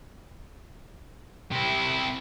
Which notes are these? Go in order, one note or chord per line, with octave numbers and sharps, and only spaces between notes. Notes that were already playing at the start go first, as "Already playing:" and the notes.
C3 E4